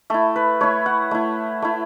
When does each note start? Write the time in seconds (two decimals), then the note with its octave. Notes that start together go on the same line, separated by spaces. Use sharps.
0.10 A3 E4 A4
0.36 B4
0.61 A3 E4 C#5
0.86 F#5
1.11 A3 E4
1.62 A3 E4